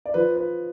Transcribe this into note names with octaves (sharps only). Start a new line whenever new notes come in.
D5
F3 B4
B4